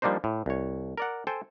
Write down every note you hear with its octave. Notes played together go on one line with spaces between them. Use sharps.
F3 G3 A#3 D4 D#4 C5
A2
C2 C#5
A#4 D5 F#5
A4 C5 G5 G#5